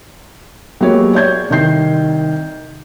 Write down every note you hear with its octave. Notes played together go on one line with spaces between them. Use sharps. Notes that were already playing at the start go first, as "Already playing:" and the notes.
F#3 G#3 A#3 B3 G4 C#5
C#5 D5 G6 G#6
C2 D#3 G6 C7